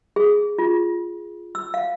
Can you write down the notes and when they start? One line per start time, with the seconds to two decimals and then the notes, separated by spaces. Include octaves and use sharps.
0.16 G#4
0.58 F4
1.55 E6
1.74 F5